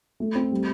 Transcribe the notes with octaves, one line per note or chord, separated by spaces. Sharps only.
A3
C4
G3